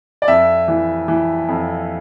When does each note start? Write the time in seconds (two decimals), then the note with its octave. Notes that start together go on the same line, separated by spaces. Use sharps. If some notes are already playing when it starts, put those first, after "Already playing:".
0.22 D5
0.28 F2 E5
0.68 E3
1.08 E3
1.49 F2